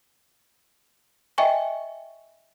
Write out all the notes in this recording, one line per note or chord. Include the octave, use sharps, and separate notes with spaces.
D#5 E5 G5 G#5 C#6